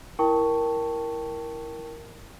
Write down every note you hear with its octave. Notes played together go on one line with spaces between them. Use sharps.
E4 A#4 G5 A5 C#6